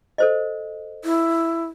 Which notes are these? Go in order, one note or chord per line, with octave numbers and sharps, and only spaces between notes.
A4 C5 D#5
E4